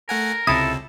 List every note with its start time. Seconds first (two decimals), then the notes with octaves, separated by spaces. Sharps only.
0.09 A3 A#4 F#5 G#5
0.47 C#2 C3 E4 A4 D#6